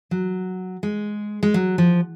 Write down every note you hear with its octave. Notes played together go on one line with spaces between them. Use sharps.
F#3
G#3
G#3
F#3
F3